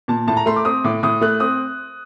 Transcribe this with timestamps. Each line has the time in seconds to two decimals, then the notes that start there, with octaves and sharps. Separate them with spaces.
0.08 A#2 A5
0.27 A2 A5
0.37 A#5
0.46 A3 C6
0.56 D6
0.65 C4 D#6
0.84 A2 D6
1.03 A2 D#6
1.21 A3 F#6
1.40 C4 D#6